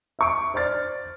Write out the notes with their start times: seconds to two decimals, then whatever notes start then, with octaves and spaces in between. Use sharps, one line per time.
0.19 E5 C#6 D7
0.54 C5 D5 F6 A6